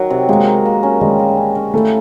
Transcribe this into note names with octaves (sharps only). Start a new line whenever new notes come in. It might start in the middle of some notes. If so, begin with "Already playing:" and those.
Already playing: D#3 F#3
C3
G#3 A#3
A#3
A#3
C#4
G3 G#3
A#3
C#4
C#4
A3 E4